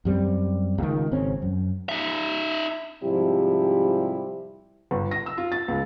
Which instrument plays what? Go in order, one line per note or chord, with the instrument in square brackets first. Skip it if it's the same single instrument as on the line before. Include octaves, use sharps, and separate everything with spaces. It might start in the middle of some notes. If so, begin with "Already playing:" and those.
[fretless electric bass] F#2 G3 C4
C#2 D#3
G#1 C#3 C4 C#4
F#2
[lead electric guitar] D#4 E5
[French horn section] G#2 C3 F3 G3 E4 G4
[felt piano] G1
A#6
E6
F4
A6
C#2